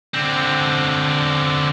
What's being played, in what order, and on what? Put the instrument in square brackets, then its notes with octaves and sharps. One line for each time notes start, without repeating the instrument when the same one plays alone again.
[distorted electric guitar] D3 C4